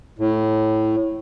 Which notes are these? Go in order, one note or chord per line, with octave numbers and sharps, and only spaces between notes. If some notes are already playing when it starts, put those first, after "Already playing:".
A2